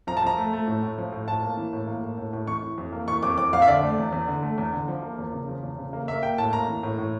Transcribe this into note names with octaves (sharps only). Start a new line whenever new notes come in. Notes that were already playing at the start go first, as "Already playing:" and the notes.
F3 A#5
A5
F3 A#5
A3
A3
A2
A2
F3
A2
A2 A5
A#3
E3
A2
A#3
A2
A2
A2
E3 C#6
E3
F2
A#3
E3 C#6
F2 D6
F2 D6
F2 F5
E5
D3 D5
A3
E2
E2
D3
A3
E2
D3
F3
A#3
E2
C#3
F3
E2
C#3
A#3
A#3 E5
A#3 G5
A2 A5
A#3 A#5
E3
A2
A2